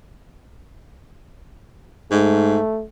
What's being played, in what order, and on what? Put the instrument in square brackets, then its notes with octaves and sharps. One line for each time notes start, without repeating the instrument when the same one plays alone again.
[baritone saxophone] G#2 [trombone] A3